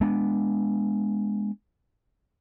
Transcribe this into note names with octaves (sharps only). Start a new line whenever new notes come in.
G#3 B3 D4